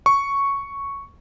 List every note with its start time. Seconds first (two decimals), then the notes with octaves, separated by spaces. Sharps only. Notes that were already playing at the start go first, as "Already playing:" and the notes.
0.06 C#6